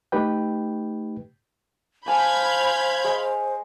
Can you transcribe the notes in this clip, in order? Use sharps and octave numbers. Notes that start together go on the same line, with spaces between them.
A3 D#4 G4 B4 G5
C5 F5 G#5 A5 B5 G6 G#6
G#3